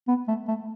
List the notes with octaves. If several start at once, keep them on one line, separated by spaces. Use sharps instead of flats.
B3
A3
A3